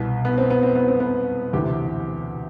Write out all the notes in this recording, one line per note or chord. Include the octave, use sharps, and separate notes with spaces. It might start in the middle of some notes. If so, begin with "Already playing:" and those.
Already playing: C2 B2
B3
C4
B3
C4
B3
C4
B3
D2 C3 E3 G4